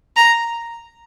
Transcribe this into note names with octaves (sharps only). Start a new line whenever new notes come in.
A#5